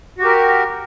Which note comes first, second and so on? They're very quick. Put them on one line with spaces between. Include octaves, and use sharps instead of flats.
F#4 G4 A#4